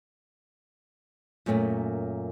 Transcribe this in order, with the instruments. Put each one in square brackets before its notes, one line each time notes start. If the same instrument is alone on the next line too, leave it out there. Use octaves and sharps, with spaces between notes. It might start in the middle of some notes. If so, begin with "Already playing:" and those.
[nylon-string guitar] F#2 A#2 A3 B3 C#4